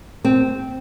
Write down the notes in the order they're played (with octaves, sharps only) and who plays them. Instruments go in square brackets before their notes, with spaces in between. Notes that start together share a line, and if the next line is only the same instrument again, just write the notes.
[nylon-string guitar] C4